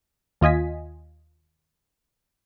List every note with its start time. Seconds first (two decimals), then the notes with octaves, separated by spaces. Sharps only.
0.41 D#2 F4 D#5 G#5 B6